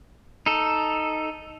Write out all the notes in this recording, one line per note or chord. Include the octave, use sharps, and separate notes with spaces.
D#4 A4